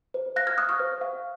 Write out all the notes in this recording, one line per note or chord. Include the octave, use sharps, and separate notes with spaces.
C5
F5 F#6 A#6
F6 G#6
F5 D#6 F#6
C#6 F6
C5
F5